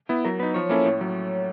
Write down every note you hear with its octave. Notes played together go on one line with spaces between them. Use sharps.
B3 E4
F#3 A#4
B3 D#4 B4
F3 C#5
A#3 C#4 E4 A4
A2
F#3